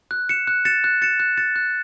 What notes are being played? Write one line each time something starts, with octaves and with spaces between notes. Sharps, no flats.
F#6
C#7 E7
F#6
A6 C#7 E7
F#6
A6 C#7 E7
F#6
A6 C#7 E7
F#6